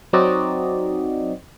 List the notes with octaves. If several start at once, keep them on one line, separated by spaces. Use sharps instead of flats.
F#3 C4 D#4 F#4 D5 D#5